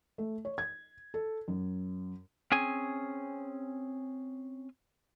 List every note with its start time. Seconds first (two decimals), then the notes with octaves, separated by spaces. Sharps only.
0.18 A3
0.45 C#5
0.58 G#6
1.14 A4
1.48 F#2
2.52 C4 C#4 G#4 G#5